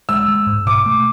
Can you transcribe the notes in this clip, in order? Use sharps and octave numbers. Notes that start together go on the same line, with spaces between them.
G#3 E6
G#3
G#2
B2 D6
A3